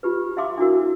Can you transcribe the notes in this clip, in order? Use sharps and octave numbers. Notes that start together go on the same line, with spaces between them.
F4 G4 B4
E5 F5 C6 D6
D4 E4 F#4 A#4